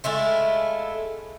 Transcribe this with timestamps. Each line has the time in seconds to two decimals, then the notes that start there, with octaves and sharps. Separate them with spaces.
0.04 G#3 A3 E4 F4